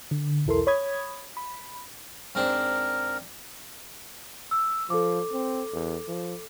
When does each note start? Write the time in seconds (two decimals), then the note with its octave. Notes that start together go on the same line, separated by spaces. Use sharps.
0.11 D3
0.46 B1 E2 E4 A4 A#4 C6
0.67 C#5 B5 D#6 G#6
1.37 B5
2.35 G#2 C4 D4 A#4
4.51 E6
4.90 F3 A4 D6
5.33 C4
5.73 E2
6.08 F3